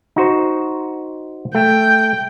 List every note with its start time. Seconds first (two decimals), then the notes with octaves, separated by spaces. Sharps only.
0.16 D#4 F#4 C5
1.55 A3 G5